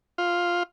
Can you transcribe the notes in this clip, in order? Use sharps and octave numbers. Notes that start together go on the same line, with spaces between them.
F4